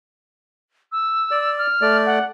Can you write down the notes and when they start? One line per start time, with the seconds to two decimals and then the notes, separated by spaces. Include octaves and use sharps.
0.92 E6
1.31 D5
1.58 F6
1.82 A3 D5
2.06 F#5